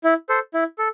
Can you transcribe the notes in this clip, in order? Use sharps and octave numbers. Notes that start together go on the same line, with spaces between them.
E4
A4 C5
E4
A4